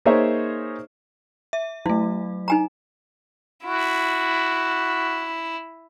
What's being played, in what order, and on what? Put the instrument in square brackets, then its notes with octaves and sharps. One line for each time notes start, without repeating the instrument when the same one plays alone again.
[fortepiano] A#3 D#4 G#4 C5 C#5 E5
[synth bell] E5
[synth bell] F#3 A3 [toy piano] E4
[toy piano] D#4 G#5 A#5
[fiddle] E4 [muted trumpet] F#4